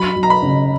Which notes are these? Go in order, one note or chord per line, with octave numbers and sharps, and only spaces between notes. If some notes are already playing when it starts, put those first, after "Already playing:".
Already playing: F#3 B5
F#3
A#5
B5
C#3